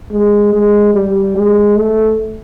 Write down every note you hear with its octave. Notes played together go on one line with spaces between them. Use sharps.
G#3
G#3
G3
G#3
A3